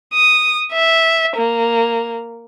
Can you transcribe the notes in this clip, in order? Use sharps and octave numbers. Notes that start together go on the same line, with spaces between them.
D#6
E5
A#3